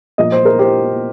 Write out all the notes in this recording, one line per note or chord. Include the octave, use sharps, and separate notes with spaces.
A#2 F3 A#3 D#5
C5
A#4
G4 C5